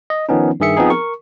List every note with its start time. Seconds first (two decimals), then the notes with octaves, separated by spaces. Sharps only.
0.10 D#5
0.29 D#3 F3 B3 C#4 D#4
0.60 G2 D#3 G#4 E5 C#7
0.77 F3 B3 C4 D#4 G#4
0.90 A#4 C#6